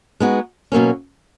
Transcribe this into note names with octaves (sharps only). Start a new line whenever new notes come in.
G#3 B3 D#4 F#4
B2 F#3 A#3 C#4